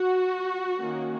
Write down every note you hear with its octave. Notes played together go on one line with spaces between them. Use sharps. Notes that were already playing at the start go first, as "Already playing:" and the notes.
Already playing: F#4
D#3 A#3 C#4